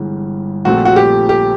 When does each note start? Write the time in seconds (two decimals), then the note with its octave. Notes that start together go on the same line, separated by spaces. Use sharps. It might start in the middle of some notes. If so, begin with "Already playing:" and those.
Already playing: G1 G2 E3 G#3
0.65 A#1 A#2 F3 A3 C4 F#4
0.85 F#4
0.96 G4
1.29 G4